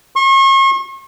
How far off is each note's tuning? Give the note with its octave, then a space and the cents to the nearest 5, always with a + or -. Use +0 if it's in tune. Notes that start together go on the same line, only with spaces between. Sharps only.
C#6 -40